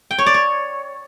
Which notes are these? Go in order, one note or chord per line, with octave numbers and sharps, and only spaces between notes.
G5
C#5
D5
C#5